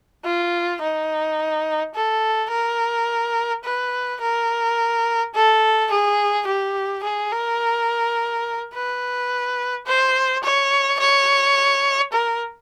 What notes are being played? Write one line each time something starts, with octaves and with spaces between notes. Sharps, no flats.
F4
D#4
A4
A#4
B4
A#4
A4
G#4
G4
G#4
A#4
B4
C5
C#5
C#5
A#4